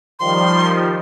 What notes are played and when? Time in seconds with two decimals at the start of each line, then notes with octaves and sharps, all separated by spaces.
0.19 D#3 F3 G3 C6